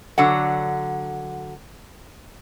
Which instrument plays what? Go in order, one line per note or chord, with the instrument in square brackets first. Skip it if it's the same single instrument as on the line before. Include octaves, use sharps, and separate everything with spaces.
[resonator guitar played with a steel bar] D3 F#3 F#5